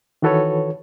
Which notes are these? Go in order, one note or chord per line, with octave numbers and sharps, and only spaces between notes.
D#3 E3 F#4 A4 B4 C#5